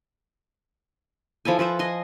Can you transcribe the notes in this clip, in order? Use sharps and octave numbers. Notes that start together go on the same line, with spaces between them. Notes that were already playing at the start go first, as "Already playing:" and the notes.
F3 E4 A4 G#5
F3 B4 C5 E5
D#5 G#5 C6